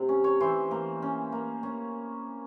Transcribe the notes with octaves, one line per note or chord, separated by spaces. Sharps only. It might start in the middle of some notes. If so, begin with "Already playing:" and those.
Already playing: C3
C#4
C#5
E3 C5
A#3
C#4
A#3
C#4